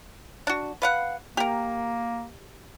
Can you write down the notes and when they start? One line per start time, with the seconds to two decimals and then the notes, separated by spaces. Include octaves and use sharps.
0.47 D4 F#4
0.82 B4 F5 F#5
1.37 A#3 G4 A#4